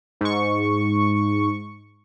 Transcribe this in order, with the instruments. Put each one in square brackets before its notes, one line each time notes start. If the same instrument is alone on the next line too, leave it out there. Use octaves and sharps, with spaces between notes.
[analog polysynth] G#2 C#6